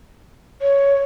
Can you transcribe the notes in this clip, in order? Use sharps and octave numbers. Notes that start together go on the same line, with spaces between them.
C#5